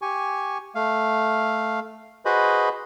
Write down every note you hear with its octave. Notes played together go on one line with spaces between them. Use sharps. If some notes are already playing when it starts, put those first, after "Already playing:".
G4 G#5 C#6
A3 F5
F#4 G#4 B4 C5 D#5 B5